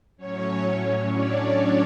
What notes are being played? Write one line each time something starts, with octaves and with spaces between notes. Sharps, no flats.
A2 F#3 C#4 C#5
C#4 C#5
D4 D5